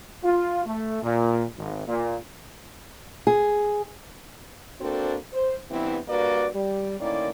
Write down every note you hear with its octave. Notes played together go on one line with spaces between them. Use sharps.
F4
A3
A#2
G#1
A#2
G#4
A#3 C4 D4 F#4 A4 C5
C5
G2 E3 B3 C4 E4
G2 A#3 F#4 A#4 B4 D5
G3
A2 D#3 A#3 C#4 E4 D5